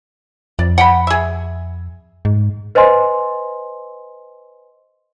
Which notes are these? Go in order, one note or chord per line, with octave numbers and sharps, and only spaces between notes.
F2 D5
F#5 G5 B5
G#4 E5
G#2
B4 C5 D#5 G#5 C6